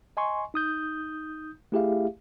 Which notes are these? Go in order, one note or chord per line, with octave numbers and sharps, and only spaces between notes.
D#5 G#5 C6 C#6
D#4 D#6 G6
A3 E4 G4 G#4 E5 F5